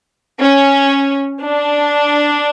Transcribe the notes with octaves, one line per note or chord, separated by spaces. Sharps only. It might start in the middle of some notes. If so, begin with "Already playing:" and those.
C#4
D4